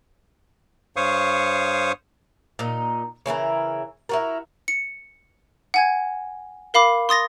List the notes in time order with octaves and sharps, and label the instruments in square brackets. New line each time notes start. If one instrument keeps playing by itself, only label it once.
[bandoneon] G2 C5 C#5 F5 C#6 D#6
[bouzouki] A#2 D#4
C#3 E3 E4 A#4
E4 F#4 A#4
[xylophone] C#7
F#5 G#5 G#6
A#4 F5 B5 D6
C6 D#6 A6 A#6